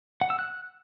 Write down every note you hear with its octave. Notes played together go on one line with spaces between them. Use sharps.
F#5
E6
F#6